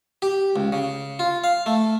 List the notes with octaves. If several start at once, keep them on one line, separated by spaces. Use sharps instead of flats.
G4
C#2
C#3
F4
F5
A3